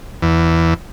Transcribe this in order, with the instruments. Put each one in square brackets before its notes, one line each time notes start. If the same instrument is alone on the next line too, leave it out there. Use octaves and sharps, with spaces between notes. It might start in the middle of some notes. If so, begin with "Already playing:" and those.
[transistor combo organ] E2